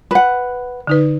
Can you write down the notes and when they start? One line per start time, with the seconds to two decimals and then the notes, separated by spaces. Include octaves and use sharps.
0.11 B4 F#5
0.87 D3 D#4 B4